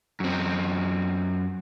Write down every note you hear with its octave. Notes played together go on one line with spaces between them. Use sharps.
F#2 C4